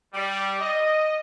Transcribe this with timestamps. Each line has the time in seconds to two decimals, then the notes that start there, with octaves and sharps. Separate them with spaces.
0.14 G3
0.60 D#5